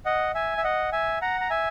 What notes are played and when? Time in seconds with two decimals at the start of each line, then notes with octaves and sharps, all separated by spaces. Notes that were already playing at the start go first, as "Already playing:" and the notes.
0.05 D#5 F#5
0.35 E5 G#5
0.58 E5
0.64 D#5 F#5
0.92 E5 G#5
1.22 F#5 A#5
1.41 A#5
1.50 E5 G#5